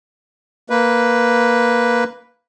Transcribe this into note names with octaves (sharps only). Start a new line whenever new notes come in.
A#3 B4